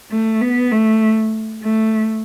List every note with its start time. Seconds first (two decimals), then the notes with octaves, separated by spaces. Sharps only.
0.11 A3
0.42 B3
0.71 A3
1.63 A3